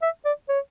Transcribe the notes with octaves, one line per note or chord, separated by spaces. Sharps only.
E5
D5
C#5